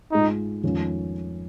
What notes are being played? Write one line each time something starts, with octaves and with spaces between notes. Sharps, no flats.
G#2 G#3 D#4 F4
F2 D#3 G#3 C#4 F4